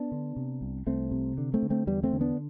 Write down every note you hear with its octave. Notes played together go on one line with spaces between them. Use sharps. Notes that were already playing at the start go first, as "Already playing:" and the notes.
Already playing: B3 D4
D3
C3
C2
C2 A3 C4
C3
D3
A3 C4
D3
A3 C4
E2 G3 B3
A3 C4
D3
B3 D4